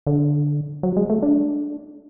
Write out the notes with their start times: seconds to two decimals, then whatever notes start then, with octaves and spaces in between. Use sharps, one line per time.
0.07 D3
0.83 F#3
0.97 G#3
1.10 A3
1.22 D4